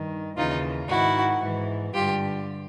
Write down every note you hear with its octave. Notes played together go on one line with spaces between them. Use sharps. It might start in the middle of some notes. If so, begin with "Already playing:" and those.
Already playing: G2 D#3
D#2 C#3 E3 D#4 F4
G#2 D#3 E4 F#4
G#2 E3
G2 D3 F4 G4